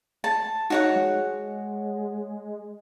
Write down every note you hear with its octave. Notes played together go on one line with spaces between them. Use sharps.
A5
D#4 F#4 C#5 F#5
G#3